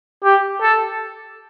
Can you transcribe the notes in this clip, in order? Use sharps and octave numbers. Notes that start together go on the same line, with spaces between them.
G4
A4